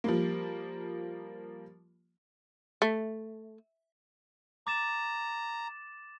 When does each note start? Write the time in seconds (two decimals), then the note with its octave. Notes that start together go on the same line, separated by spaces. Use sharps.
0.04 F3 G3 A#3
2.82 A3
4.67 A#5 D6 A6 E7